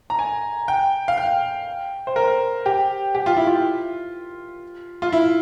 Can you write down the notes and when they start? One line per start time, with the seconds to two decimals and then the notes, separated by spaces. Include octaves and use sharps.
0.10 A#5
0.19 G#5
0.68 G5
1.08 F5
1.18 G5
2.07 C5
2.16 A#4
2.66 G4
3.15 G4
3.26 F4
3.37 E4
3.47 F4
5.02 F4
5.12 E4